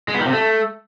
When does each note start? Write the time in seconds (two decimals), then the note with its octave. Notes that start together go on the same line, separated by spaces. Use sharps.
0.08 G#3
0.14 B3
0.20 D#3
0.26 C3
0.32 A3